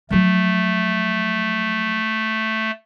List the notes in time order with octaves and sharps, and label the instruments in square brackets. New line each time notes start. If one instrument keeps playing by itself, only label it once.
[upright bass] F3 F#3 [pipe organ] A3